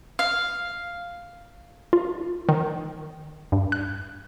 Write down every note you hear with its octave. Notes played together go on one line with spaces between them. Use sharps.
F5
F4
D#3
G2
F#6